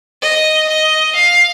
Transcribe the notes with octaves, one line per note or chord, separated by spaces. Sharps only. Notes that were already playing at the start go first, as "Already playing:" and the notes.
D#5
D#5
F5